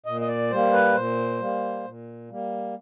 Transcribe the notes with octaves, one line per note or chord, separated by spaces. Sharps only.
A#2 D#5
D#5
D5
G3 A#3 C5
B4
A#2 C5
G3 A#3
A#2
G3 A#3